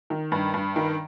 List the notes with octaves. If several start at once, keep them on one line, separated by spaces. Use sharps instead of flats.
D#3
G2
G2
D#3